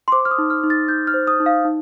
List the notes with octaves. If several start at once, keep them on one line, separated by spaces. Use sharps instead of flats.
C6
C5 D6
F6
D#6
D#4
F6
D#4
A6
D#4 G6
F6
C5
D#6
D#4
F5
D#4